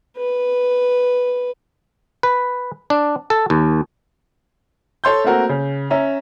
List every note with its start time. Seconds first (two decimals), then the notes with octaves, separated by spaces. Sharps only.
0.17 B4
2.23 B4
2.90 D4
3.30 A4
3.50 D#2
5.04 A4 C#5 C6 G6
5.24 A3 A#3 C4 F#4 A#4
5.49 C#3
5.90 C#4 E5 A#5